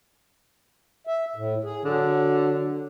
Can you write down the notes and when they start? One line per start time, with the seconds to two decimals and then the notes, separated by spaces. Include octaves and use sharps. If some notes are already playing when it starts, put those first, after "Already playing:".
1.07 E5
1.36 A2
1.64 G#4
1.84 D3 F#3